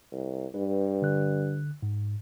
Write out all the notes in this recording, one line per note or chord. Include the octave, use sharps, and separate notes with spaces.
C2
G2 B4
D3 F#6
G#2